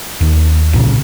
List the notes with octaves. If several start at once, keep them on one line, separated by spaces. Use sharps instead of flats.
D#2
B1 A#2 C#3